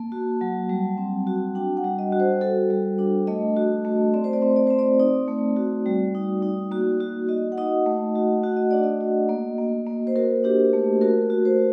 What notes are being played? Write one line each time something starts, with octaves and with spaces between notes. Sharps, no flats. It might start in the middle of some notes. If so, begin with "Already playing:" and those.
Already playing: A#3 A5
F#4
F#3
G3
C4
F#4
D4 G5
F#5
G3
D#5
F#4
C5
F#4 A4
G3
D4
A3 D#5
F#4
A3
C4 D5
C5
D5
C4
D5
C4 C5
D5
D#4 D5
A3
F#4
G3
D#4
D#4
A#3 F#4
F#4
F#4 D#5
F#5
D#4 D#5
A3
F#4
F#4 F#5
D#5
D4 D5
D#5
F#4
A#3
A#3
A#3
C5
F#4 A#4
D4 G4
A3
F#4 A#4
F#4
C5